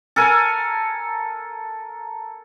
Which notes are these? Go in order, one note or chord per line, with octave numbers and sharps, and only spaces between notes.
A4 A#4 G#5